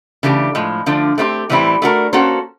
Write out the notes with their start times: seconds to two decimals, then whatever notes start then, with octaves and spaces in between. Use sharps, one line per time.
0.23 C#3 E3 A3 D4 G4
0.55 A2 F3 G#3
0.86 D3 F3 A3 D4
1.18 A3 C4 E4 G4
1.49 A2 E3 G3 C4 E4
1.82 A3 D4 F#4 A#4
2.13 A#3 C#4 F#4 A4 C5